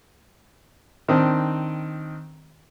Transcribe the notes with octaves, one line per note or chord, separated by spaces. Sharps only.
D#3 C4 D4